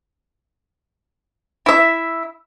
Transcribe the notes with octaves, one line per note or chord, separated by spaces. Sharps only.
E4 E5